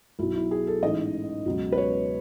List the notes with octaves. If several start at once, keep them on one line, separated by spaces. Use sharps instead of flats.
B1 B2 F#3 E4
E4
G#4
A4
A1 G#2 E3 D#5
C#2 B2 F#3
B4
C#5